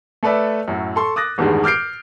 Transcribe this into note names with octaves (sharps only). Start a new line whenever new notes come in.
A3 A4 B4 D5 E5
F#2 A2 F#3
A4 C6 C#6
D6 D#6 F#6 A6 A#6
A1 E2 G2 D#3 G3 G#3
D6 F6 G6 C7 D7